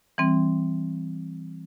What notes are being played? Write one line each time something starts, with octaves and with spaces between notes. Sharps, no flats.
E3 G3 C4